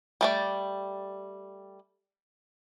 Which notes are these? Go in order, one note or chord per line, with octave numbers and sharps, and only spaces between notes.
G3 A3 D5